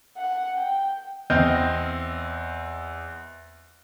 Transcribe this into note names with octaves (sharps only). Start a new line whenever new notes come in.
F#5
G5
E2 C4 D#5 F6 G6